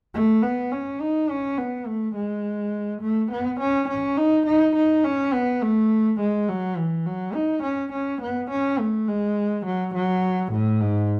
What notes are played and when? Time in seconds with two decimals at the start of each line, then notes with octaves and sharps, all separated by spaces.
0.14 A3
0.43 B3
0.72 C#4
1.00 D#4
1.30 C#4
1.58 B3
1.87 A3
2.15 G#3
3.02 A3
3.31 B3
3.60 C#4
3.88 C#4
4.18 D#4
4.47 D#4
4.76 D#4
5.04 C#4
5.33 B3
5.62 A3
6.20 G#3
6.49 F#3
6.77 E3
7.06 F#3
7.34 D#4
7.63 C#4
7.92 C#4
8.22 B3
8.50 C#4
8.79 A3
9.08 G#3
9.65 F#3
9.95 F#3
10.53 A2
10.81 G#2